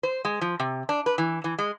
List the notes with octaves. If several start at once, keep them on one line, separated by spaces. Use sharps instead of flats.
C5
G#3
F3
C3
D4
B4
E3
E3
G#3